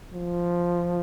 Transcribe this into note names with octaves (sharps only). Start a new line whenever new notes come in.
F3